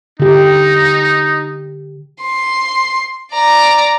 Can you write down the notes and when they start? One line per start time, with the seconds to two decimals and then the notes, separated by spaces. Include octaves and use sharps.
0.20 D3 D#4 G4
2.22 C6
3.32 D5 A#5